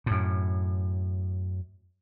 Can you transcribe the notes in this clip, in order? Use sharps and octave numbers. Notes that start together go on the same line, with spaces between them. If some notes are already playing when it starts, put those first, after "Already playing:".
F#2 A2